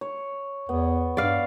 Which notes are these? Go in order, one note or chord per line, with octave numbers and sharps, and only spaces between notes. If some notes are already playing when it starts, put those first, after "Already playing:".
C#5
E2 B3
G2 D5 F5